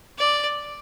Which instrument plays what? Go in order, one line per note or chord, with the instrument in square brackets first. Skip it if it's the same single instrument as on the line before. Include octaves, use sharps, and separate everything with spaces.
[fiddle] D5